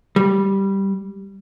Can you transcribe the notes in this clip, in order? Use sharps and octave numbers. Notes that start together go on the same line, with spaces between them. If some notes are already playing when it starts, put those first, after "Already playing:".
G3